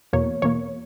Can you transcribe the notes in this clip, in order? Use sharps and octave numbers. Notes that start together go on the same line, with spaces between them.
E2 B2 A#3 C#5
E2 B2 A#3 C#5